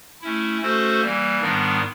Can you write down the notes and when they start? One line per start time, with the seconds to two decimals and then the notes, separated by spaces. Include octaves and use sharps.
0.21 A3 C#4 E4
0.61 A3 C#4 F#4 A4 C5
1.02 E3 G3 A#3
1.41 G#2 D#3 G3 B3 D4